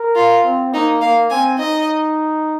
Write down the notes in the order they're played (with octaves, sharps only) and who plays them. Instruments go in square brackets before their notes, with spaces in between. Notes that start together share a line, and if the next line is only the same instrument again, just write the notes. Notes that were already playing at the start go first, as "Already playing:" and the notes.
Already playing: [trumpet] A#4
[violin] F4
[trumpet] C4
[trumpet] A#3 [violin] D#4
[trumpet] A#3 [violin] F5
[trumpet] C4 [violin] G#5
[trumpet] D#4 [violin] D#5